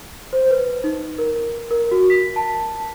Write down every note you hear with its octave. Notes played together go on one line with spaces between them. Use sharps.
C5
B4
D#4
A#4
A#4
F#4
B6
A5